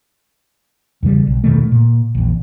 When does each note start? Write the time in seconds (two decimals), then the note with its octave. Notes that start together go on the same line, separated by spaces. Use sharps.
1.03 E2 C#3 G3
1.27 B1
1.44 E2 B2 D#3 A3
1.72 A#2
2.15 A#1 E2